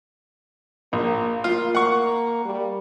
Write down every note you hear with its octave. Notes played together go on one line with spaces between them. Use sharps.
A#1 A#3
A#3 F4
F#5 C#6
G3